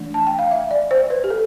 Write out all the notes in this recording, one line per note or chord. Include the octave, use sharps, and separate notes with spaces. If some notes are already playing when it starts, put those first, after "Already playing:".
Already playing: E3 A3 D4
A5
G5
F5
E5
D5
C5
B4
G4
A4